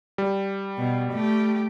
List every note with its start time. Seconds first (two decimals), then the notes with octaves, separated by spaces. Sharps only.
0.18 G3
0.78 B2
1.12 A3 G4